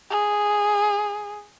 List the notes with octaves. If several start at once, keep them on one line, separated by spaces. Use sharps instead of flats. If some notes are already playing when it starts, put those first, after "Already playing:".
G#4